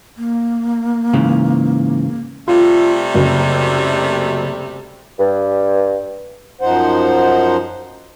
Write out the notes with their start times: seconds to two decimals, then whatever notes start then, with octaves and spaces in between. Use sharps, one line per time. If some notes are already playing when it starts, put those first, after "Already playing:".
0.18 A#3
1.14 G#2 C#3 E3
2.48 C3 G3 A3 F4
3.14 F#1 F#3
5.19 G2
6.61 F#2 F3 D#4 C5 F#5